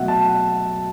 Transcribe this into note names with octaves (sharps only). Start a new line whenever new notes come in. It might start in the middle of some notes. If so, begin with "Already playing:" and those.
Already playing: B2 F#3 A3 E5 F#5
A5
F#5